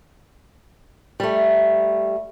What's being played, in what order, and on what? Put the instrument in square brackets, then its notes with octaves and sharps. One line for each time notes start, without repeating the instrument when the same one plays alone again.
[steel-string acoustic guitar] G3 A3